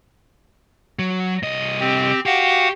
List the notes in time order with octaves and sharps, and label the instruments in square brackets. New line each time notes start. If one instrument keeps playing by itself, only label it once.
[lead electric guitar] F#3
C2 D#5
[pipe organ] C4 G4
[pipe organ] F#4 F5 F#5 [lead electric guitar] G4